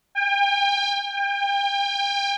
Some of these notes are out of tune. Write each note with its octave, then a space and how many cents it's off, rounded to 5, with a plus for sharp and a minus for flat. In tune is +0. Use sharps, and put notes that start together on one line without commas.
G5 +40
G5 +35